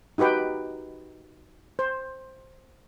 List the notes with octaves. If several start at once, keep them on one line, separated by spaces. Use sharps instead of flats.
D#4 F#4 G4 B4 G5
C5